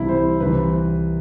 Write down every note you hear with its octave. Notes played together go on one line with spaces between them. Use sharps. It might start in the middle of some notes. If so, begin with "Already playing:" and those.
Already playing: C2 C3 E3 E4
C5
C2 C3 E3 B4